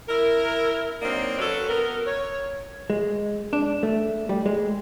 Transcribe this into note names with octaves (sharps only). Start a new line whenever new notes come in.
E4 A#4
F#3 A#3 C4 D4 D#4
F#3 C#4 A4 B4 C#5
B3 A#4
C#5
G#3
D4
A3
G3
G#3